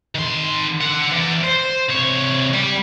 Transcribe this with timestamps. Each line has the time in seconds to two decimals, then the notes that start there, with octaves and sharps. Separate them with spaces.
0.15 D#3 C6
0.81 D3 F#5
1.12 E3 D5
1.44 C5
1.90 C2 C#5
2.54 G3